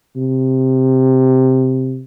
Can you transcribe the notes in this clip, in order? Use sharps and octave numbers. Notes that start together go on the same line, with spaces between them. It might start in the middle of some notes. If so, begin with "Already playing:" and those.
C3